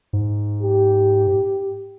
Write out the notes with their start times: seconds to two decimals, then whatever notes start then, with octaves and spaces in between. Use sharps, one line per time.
0.13 G#2
0.62 G4